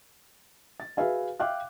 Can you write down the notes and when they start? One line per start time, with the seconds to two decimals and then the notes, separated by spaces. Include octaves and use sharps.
0.80 A6
0.97 F#4 G#4 B4 E5 F5 G#5
1.40 E5 F5 G5 D6 F#6